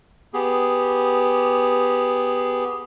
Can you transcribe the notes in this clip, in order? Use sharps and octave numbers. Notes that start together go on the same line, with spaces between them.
B3 G4 G#4